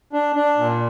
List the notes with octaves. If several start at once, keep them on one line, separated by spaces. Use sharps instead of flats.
D4
D4
A#2